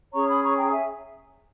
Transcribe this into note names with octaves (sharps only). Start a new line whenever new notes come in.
C#4 G#4 C#5 A#5 C#6
B5 D#6
A#5 C#6
G5 A#5
E5 G#5